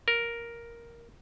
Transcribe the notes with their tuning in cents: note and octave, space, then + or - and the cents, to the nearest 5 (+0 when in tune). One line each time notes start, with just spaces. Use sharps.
A#4 +5